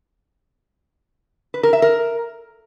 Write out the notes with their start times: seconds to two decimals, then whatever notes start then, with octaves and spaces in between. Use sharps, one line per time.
1.54 B4
1.63 A#4
1.73 E5
1.82 A#4